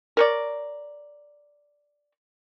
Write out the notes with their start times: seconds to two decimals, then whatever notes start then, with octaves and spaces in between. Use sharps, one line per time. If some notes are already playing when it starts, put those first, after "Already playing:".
0.17 A#4 C#5 D5